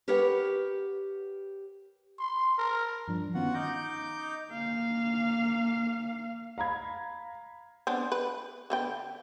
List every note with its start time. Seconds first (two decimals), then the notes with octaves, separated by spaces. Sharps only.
0.08 G4 A#4 B4 C#5 F#5
2.19 C6
2.58 A#4
3.08 G2 F3 D4
3.34 D#3 B3 C#4 F4 F#4 F#5
3.54 D#4 D6 G6 A#6
4.50 A#3 F5
6.58 F5 A#5 B5 G#6
7.87 B3 C4 D4
8.12 B4
8.70 D3 B3 G5